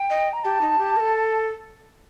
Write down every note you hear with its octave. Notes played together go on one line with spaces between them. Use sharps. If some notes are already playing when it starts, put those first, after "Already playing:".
Already playing: G5
D#5
A#5
G4 A5
D#4
G4
A#4
A4